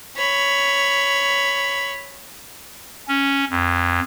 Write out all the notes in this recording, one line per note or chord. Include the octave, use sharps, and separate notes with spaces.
C#5 B5
C#4
F2